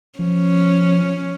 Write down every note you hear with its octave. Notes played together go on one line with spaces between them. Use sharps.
F3 C#4